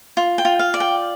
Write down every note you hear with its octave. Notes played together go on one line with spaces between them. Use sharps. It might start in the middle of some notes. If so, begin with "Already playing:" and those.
F4
G5
F4
F5
D5
G5